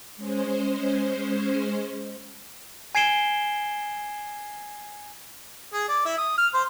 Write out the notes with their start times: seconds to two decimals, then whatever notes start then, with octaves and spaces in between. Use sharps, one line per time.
0.17 G#3 C#4 C5
2.95 G#5 G#6 C7 D7 E7 G7
5.74 G#4
5.88 D5
6.05 E4
6.18 D#6
6.38 F6
6.54 C5